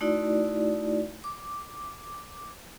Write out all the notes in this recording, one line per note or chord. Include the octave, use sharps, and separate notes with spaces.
A3 D#4 E4 F#4 D5
D6